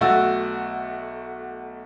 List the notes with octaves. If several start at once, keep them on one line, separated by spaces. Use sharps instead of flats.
B1 A3 F#4 E6 A6